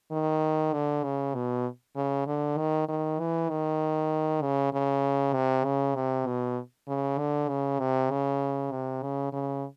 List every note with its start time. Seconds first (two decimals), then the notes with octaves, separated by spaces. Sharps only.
0.12 D#3
0.74 D3
1.04 C#3
1.35 B2
1.96 C#3
2.27 D3
2.58 D#3
2.88 D#3
3.19 E3
3.50 D#3
4.42 C#3
4.73 C#3
5.34 C3
5.65 C#3
5.96 C3
6.26 B2
6.88 C#3
7.18 D3
7.49 C#3
7.80 C3
8.11 C#3
8.71 C3
9.02 C#3
9.33 C#3